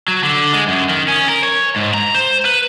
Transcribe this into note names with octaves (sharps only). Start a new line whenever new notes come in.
F#3
D3
G#3
F#2
D#3
C#4
A#4
C#5
G#2
A#5
C5
B4